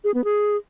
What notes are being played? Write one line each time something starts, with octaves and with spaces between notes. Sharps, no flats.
G#4
B3
G#4